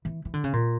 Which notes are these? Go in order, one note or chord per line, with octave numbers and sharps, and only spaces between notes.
E3
E3
D3
C#3
A#2